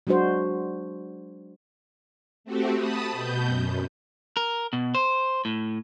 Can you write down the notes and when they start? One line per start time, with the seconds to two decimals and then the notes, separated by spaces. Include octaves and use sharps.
0.07 F#3 G#3 D4 F#4 C5
2.44 A3 C4 F#4 G4
2.76 A5 B5 D#6
3.12 B2 G6
3.46 F#2
4.37 A#4
4.73 B2
4.95 C5
5.45 A2